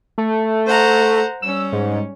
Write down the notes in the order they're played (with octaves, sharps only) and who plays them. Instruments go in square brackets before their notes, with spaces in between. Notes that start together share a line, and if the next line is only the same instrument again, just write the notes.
[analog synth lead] A3
[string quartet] C5 F#5 A#5
[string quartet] G3 C#4 [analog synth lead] E6
[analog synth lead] G#2